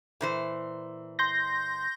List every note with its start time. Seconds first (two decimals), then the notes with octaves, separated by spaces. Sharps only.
0.21 A#2 E3 C5
1.19 C6 G6 A#6